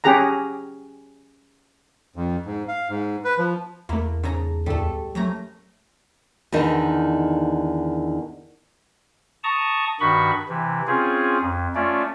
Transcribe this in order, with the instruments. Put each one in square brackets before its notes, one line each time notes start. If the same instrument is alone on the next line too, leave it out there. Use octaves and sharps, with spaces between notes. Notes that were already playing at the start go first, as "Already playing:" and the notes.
[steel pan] C#4 G4 G#4 F#5 A#5
[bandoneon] F2
G#2
F5
G#2
B4
F3
[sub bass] E2 [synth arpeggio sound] A3 E4 [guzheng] A#3
[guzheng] G#2 A4 A#5 [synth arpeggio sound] C#3
[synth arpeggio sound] A1 D2 B2 [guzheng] G3 A3 [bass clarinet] A4
[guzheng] F2 C#4 A#5 [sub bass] F#3 [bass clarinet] A3
[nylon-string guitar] E2 D3 D#3 D#4
[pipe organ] A5 A#5 C#6 D#6
G2 D#3 F#4 B5 C#6
C3 E3
C4 C#4 F4 G#4
F2
A3 C#4 F4 D5